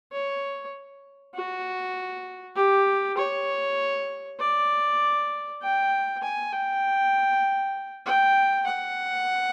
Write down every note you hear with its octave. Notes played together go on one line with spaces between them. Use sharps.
C#5
F#4
G4
C#5
D5
G5
G#5
G5
G5
F#5